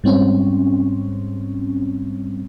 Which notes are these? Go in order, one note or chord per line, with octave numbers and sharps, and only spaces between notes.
G#2 G3 C4 C#4